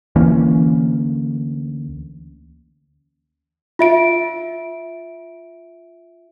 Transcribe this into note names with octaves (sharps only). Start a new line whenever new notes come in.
D2 E3 A#3 C#4
F4 E5 D7